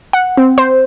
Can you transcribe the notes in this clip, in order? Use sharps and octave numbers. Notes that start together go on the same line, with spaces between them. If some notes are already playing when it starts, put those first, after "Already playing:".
F#5
C4
C5